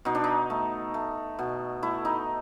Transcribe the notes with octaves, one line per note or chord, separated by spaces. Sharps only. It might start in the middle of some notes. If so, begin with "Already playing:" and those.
B2 D#4
D4
D#4
A3
A3
B2
A3 E4
D#4